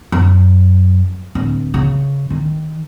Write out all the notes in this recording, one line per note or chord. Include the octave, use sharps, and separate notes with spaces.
F#2
D1
C#3
D#3